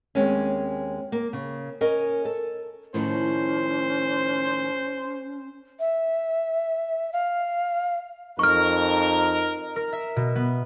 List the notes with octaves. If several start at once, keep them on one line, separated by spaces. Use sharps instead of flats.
D#2 G#3 C4 C#4
A#3
C#3
C#4 A#4 D#5
A4
A2 D#3 F3 C#4 C5
E5
F5
F2 D#4 A#4 C#6 F6
A#4
E5
B2
B3